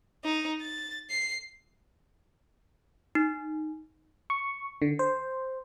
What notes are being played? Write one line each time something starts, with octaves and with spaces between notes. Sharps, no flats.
D#4
A6
C7
D#4
C#6
D3
C5